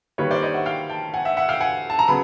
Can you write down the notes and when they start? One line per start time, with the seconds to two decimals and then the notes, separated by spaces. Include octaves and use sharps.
0.18 D#3 G3 A#3 B4 C#5
0.31 C5 D5
0.42 C#5 D#5
0.54 E5 F#5
0.66 F5 G5
0.90 G5 A5
1.14 F#5 G#5
1.25 E5 F#5
1.37 E5 F#5
1.49 F5 G5
1.60 F#5 G#5
1.90 A5
1.99 A#5
2.08 C#3 F#3 B3 B5